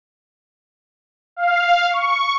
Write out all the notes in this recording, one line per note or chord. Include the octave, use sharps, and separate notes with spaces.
F5
C#6